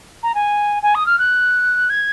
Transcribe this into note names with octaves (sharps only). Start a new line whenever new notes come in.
A#5
G#5
G#5
D#6
F6
F#6
G#6